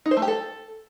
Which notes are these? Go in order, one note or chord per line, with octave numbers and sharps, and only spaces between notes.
D#4
C5
A3
G4
A4